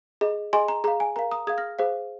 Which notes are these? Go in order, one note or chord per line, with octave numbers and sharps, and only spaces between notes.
G#4 D#5
G#4 D#5 G#5 C6
A#5
G#4 F5 A#5
G#5
A#4 F5 A#5
A#5 D#6
G#4 F5 D#6 G#6
F6 A#6
G#4 C5 F5